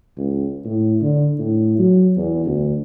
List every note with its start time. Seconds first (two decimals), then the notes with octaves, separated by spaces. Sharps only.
0.17 C#2
0.65 A2
1.02 D3
1.39 A2
1.79 F#3
2.17 E2
2.46 D2